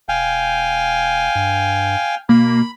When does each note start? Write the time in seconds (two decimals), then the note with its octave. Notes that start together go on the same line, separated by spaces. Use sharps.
0.09 E1 F5 G5 G#5
1.35 G2
2.29 B2 A#3 B5